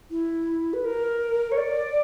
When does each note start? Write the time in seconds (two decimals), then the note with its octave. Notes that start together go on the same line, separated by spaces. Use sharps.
0.11 E4
0.73 B4
0.84 A#4
1.51 C#5
1.57 D5